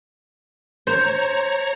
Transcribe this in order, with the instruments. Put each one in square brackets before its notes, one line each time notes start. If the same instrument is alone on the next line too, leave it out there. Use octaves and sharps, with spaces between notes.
[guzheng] C5 [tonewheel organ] C#5 A#5